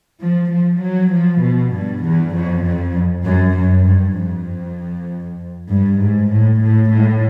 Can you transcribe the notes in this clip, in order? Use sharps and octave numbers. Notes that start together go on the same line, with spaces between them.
F3
F3
F#3
F3
B2
G2
E2
F2
F2
F#2
F#2
G2
F2
G2
G#2
A2
A2
A2